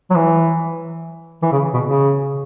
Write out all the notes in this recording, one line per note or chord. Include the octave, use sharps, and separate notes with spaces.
F#3
E3
E3
C#3
B2
C#3